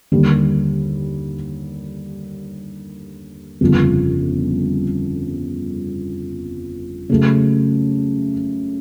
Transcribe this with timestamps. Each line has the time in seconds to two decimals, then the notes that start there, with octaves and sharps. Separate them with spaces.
0.12 D#2 D3 G3 A#3
3.61 G1 F2 C#3 F3
7.09 C#3 F#3 A3